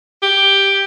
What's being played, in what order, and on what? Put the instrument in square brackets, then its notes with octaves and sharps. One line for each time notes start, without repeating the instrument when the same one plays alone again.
[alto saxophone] G4